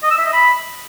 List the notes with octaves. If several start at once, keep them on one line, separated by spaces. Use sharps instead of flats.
D#5
E6
E5
D#5
B5